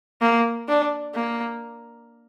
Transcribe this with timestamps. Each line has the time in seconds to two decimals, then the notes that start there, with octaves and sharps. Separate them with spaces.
0.22 A#3
0.69 D4
1.15 A#3